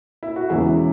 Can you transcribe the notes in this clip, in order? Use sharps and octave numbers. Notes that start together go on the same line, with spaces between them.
E4
F#4
E1 E2 C#3 E3 E4 G#4